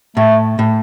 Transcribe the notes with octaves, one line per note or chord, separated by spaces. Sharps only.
A2 A3
A2